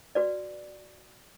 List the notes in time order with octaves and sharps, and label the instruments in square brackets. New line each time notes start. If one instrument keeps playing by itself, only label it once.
[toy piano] F#4 B4 D5